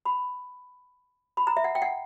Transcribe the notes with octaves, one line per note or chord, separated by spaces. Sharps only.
B5
B5
A#5
E5
F#5
G5
F#5